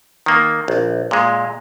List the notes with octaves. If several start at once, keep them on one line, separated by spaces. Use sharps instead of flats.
D#3 A#3
A#1
A#2 G#3